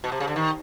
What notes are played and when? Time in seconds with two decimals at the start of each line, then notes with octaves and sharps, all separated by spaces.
0.04 B2
0.12 C3
0.20 C#3
0.28 D3
0.36 D#3